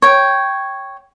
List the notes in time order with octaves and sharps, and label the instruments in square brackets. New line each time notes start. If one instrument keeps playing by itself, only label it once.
[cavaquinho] C#5 G5